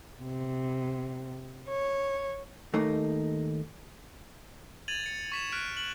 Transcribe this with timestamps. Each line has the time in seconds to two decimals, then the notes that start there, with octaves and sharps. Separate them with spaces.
0.22 C3
1.67 C#5
2.73 D#2 A3 A#3 D#4
4.88 G#6 A6 D#7 F7 F#7
5.04 A6 C#7
5.32 C#6 B6 E7
5.52 F6 F#6 B6 D7
5.77 F#7